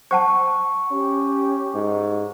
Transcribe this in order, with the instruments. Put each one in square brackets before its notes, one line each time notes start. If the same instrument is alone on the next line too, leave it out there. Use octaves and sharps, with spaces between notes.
[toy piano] C5 F#5 A5 [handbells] C#6
[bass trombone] C#4 [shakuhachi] G4
[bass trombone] G#2